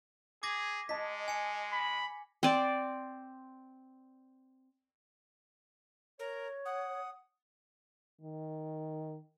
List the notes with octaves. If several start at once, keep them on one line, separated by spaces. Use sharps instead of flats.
G#4 D6 G#6 A#6
G#3 D#5 A5 B6
G#5 C#7
B5
C4 D5
A#4 C#5
F#5 D#6
D#3